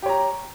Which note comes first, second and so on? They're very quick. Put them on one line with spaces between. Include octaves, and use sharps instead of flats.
G4 C#5 A#5